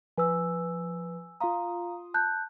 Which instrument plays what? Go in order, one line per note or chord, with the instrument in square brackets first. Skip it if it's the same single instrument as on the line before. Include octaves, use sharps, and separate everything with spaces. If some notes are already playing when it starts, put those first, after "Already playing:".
[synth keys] F3 B4 [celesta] G#5 E6
[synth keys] F4 C6 D#6 [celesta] F5 A#5
[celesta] A5 F#6 G6